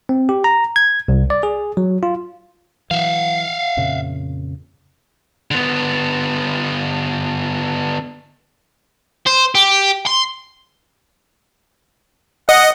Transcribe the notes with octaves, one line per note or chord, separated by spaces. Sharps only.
C4
G4
A#5
G#6
C2
D5
G#4
F#3
F4
E3 F#3 E5 F5
F2 A#2 C#3
D3 B3
C5
G4
C6
D#5 F#5